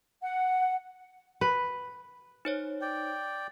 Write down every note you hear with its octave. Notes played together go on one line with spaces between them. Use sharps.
F#5
B4
D#4 C5 C#5
D5 G5